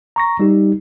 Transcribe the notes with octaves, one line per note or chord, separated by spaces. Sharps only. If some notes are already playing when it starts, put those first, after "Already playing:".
A#5 C#6 A#6
G3 D#4 G4